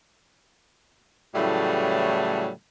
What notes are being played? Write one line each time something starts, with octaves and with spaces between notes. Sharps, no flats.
A2 C#3 E3 F#3 G3 A3